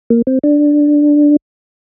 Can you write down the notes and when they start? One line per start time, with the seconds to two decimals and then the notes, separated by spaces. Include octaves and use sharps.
0.10 A#3
0.27 C4
0.44 D4